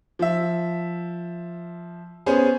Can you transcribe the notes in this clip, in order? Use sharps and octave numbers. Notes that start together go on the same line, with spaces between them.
F3 E5
B3 C#4 G#4 C5